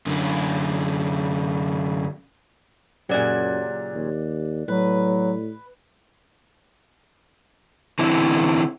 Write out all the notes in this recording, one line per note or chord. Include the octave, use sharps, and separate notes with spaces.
F#2 D3
F#2 A#2 C#3 F#3 G4 D5 F#6
D#2
A2 F#3 B4
D3 E3 C4 E4